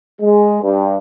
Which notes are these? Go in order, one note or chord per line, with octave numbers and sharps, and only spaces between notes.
G#3
G2